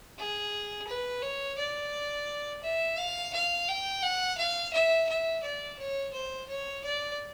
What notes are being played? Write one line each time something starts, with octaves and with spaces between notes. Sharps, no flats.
G#4
B4
C#5
D5
E5
F5
F5
G5
F#5
F5
E5
E5
D5
C#5
C5
C#5
D5